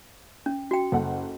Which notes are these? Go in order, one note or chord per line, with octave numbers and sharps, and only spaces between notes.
C#4
F#4 G5
F#1 A4 F#5